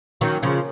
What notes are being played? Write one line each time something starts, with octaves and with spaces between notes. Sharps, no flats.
D#3 F#3 A#3 C#4
C#3 F3